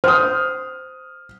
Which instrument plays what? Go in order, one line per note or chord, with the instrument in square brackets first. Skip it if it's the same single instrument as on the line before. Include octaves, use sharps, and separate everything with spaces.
[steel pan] C5 [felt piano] D#6 F6